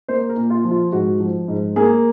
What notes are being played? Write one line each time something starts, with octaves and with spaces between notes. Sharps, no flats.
A#3 C5
A#4
A#2
F4
F3
F4
G#2 F#4
F3
G#2
A#3 G#4